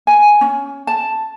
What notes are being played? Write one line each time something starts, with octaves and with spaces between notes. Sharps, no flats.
G#5
C#4
A5